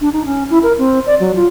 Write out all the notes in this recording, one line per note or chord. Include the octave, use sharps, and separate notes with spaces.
D4
D#4
C#4
E4
A#4
C4
D5
F#3
F4